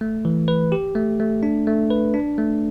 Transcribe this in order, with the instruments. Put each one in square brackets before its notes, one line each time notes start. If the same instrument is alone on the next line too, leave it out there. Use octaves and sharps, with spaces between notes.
[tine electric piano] A3
E3
B4
G4
A3
A3
D4
A3
B4
D4
A3